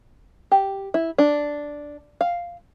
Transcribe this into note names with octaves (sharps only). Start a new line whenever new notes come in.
G4
E4
D4
F5